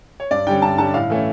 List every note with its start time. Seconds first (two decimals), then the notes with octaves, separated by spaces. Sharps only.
0.20 C#5
0.31 G2 D5
0.47 D3 G3 C#4 G5
0.62 G2 A5
0.78 D3 G3 C#4 A5
0.94 A2 F5
1.10 E3 A3 C#4